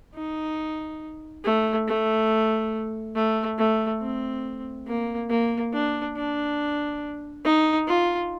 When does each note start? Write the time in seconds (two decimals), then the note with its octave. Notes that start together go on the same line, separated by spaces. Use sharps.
0.15 D#4
1.44 A3
1.88 A3
3.15 A3
3.58 A3
4.01 C4
4.87 A#3
5.30 A#3
5.73 D4
6.16 D4
7.45 D#4
7.87 F4